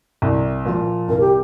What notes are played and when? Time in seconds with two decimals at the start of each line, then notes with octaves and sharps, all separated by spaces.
0.22 C2
0.65 A#2 F3
1.09 C2 A#4
1.20 G4